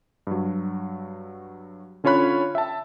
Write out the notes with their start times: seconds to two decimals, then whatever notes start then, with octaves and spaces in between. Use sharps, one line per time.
0.27 G2 F#3
2.04 D3 C#4 F4 C#5 B5 F#6
2.55 E5 G5 A5